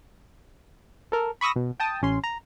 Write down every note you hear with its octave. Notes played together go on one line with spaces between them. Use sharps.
A4 A#4
B5 C#6 D#6 E6 A#6
B2
G5 A5 D#6
A1 C#4 C6
A#5